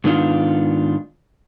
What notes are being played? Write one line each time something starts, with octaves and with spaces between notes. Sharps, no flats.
G#2 D#3 B3 D4 F4